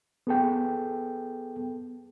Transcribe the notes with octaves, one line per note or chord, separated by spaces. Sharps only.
B3 G#4 A4 G5